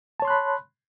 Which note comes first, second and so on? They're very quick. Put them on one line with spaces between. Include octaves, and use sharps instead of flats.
A5 C#5 C6 F#6 B5